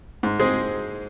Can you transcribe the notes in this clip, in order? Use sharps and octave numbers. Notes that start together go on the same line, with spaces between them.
G#2
G#3 C4 G#4